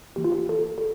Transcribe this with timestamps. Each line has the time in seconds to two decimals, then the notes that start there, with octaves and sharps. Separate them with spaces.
0.16 E3 A#3 G4
0.24 F4
0.32 G4
0.49 A4
0.78 A4